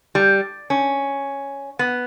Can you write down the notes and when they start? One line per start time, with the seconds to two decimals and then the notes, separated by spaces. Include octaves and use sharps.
0.15 G3
0.70 C#4
1.79 B3